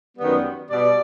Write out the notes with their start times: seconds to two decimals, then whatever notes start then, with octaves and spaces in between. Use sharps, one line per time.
0.18 F#2 D#3 G3 B3
0.70 B2 G3 B3 D5